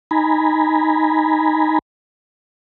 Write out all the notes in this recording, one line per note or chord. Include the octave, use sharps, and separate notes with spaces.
D#4 G#5 A#5 B5